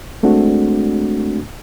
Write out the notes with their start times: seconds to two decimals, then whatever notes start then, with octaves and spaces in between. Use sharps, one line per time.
0.23 G#3 A3 C4 D4 F#4